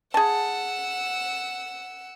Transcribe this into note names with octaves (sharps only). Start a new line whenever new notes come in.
G#4 F#5 A5 E6